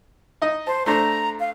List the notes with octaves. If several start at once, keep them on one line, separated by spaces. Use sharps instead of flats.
D#4 D#5
C5 A5
A3 D4 C5 A#5
F5